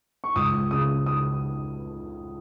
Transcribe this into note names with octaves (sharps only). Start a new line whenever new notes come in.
C#6
C#2 D#6
C#3 D#6
D#6